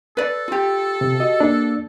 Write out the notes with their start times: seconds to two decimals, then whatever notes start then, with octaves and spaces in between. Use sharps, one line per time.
0.17 A4 B4 D5
0.48 F4 G4
1.01 C3
1.20 F#4 D#5
1.40 A#3 D4 D5